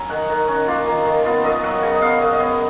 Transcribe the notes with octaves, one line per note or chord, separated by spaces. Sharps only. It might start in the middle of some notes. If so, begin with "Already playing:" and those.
Already playing: F#3 C#4 G#5 A#5
D#3 F#5
D#3
C#4
F#4
A#3 F4
D#3
D#3
B3 F4
F#2 D#5
F#3 F#5
C#3 G#5
D#5
B3 F5
F#2 D#5
D#5
B3 C#5